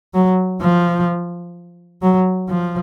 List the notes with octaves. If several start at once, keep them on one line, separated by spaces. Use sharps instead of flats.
F#3
F3
F#3
F3